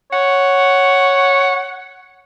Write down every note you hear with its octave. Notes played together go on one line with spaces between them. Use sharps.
C#5 F#5